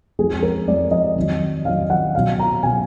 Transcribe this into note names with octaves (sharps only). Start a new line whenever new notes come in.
F2 F3 G#3 G#4
A#4
F2 F3 G#3 D5
D#5
F2 D#3 F#3
F2 D#3 F#3 F5
F#5
B2 F#3 F5
A#5
B2 F#3 G#5